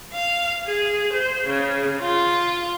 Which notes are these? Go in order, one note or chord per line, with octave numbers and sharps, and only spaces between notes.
F5
G#4
C5
C#3
F4